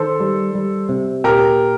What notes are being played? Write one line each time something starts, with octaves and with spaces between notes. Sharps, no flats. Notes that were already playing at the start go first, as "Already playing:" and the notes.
Already playing: D#3 A4 C5
G3
G3
C3
A#2 G4 A#4